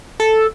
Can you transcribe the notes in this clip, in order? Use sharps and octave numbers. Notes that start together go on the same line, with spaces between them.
A4